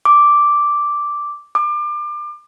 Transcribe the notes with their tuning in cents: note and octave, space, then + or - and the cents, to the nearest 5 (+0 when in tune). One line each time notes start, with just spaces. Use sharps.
D6 +0
D6 +30